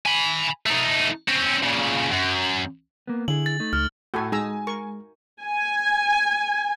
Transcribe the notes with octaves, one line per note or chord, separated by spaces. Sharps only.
G#5 B5
A3 D#4
C4 C#4
A#2 C#3
F#2
A#3 B3
D3 E4 G#4 F#7
A6
A3 D#4
C#2 F6
A2 F#4 A4 G#5
G#3 D#4 G#5 A#5 E6
A#4 C#6
G#5